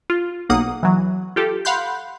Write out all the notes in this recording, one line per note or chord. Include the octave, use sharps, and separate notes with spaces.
F4
B1 A#3 F#5 D#6
E3 F#3
F4 G4 A4
F5 F#5 B5 C6 F#6 G6